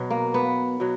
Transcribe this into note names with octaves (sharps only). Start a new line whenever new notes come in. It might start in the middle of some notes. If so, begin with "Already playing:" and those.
Already playing: B2 F#3
A#3
B3
B2 F#3